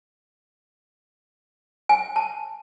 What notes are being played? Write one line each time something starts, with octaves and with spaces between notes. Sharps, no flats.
G#5
A5